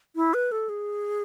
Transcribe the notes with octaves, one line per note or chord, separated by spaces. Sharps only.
E4
B4
A4
G#4